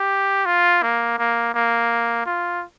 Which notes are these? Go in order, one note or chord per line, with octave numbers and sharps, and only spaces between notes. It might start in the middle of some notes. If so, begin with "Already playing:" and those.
Already playing: G4
F4
A#3
A#3
A#3
F4